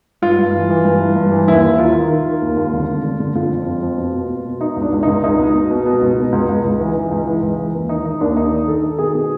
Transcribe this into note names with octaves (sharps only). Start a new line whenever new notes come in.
G2 F4
G2
E3
E3
G2
E3
G2
E3
D#2 E4
D#2
D#3 F4
D#3
D#3
D#3
D#2
D#2
D3
D3
D3
D3
D3 F4
F2
F2
F2
B2
B2
B2
B2
B2 D#4
C#2
D4
C#2
C#2 D#4
C#2 D#4
B2
B2
B2
B2
C#2
B2
C#2
C#2
C#2
E3
E3
C#2
E3
C#2
E3
D#2
D#3 D#4
D#3 D#4
D#2 D4
D#2 D#4
D#3
D#3 A4
D#3
B2 G#4
B2